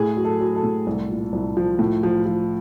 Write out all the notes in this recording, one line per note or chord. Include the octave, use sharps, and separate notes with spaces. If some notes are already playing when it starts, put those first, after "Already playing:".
Already playing: A2 G#4
F#3
A4
F#3
A4
A2
C2
A#2
C2
F3
A2
F3
F3